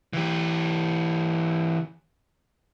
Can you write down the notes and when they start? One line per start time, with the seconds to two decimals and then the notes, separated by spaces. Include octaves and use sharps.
0.13 E3 G4